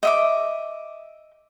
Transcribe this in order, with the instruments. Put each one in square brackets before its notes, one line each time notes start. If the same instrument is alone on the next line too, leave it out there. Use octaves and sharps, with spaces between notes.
[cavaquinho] D#5 E5 D6